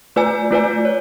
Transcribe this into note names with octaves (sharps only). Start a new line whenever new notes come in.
A3 F4 B4 D5 G#5
A3 F4 B4 D5 G#5
C#5